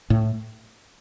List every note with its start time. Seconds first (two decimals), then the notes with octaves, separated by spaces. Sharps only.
0.10 A2